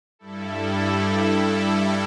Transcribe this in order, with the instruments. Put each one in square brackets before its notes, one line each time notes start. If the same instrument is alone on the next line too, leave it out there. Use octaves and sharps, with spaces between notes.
[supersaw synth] G2 G3 E4 A4